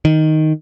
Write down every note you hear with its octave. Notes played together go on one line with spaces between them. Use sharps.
D#3